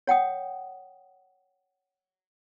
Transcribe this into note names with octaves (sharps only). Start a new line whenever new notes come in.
C#5 F#5 G5 D#6